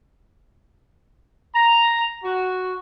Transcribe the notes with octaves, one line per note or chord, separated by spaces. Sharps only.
A#5
F#4